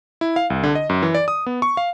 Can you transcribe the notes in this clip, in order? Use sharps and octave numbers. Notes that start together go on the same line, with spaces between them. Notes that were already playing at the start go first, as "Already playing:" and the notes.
E4
F5
C2
D3
D#5
F#2
E3
D5
D#6
B3
C#6
F5